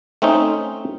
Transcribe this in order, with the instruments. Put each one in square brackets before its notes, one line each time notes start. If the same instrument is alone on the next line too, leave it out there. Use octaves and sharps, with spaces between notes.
[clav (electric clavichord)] A3 C4 C#4 D#4